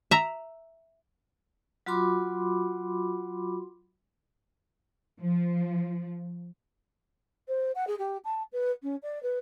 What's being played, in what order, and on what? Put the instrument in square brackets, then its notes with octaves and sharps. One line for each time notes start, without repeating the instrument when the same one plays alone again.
[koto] E5 A#5
[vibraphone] F#3 F4 F#4 B5 C6 D6
[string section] F3
[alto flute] C5
F#5
G#4
G4
A5
B4
C#4
D5
B4